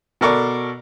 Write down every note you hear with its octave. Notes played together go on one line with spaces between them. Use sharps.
B2 A4 A#4 D5 C#6